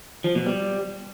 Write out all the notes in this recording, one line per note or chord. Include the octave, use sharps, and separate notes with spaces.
F3
B2
G3